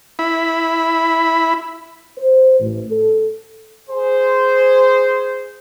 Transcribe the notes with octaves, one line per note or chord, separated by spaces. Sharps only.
E4 B5
C5
A1
A4
G#4 C5